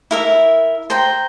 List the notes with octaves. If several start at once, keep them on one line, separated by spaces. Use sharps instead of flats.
E4 A#4 E5
C5 G5 A#5